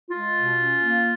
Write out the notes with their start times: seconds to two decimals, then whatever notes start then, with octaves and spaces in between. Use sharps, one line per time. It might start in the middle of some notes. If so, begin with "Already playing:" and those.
0.11 G#3 F4
0.34 B2
0.57 C#4
0.82 A#3